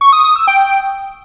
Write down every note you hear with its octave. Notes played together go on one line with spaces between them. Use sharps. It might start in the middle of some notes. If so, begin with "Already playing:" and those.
C#6
D#6
D#6
E6
G5